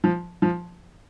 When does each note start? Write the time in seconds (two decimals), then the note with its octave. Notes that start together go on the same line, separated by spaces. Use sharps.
0.04 F3
0.42 F3